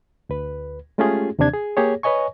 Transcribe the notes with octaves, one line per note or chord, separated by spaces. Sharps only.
D2 B4
G#3 A3 C#4 F4 G4 G#4
D#2 C3 E3 D4 G#6
G#4
A#3 G4 G#4 C#5
B4 C#5 D#5 G#5 C#6